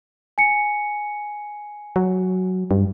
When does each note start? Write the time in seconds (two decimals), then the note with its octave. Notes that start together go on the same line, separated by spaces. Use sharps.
0.38 G#5 C#7
1.96 F#3
2.71 G2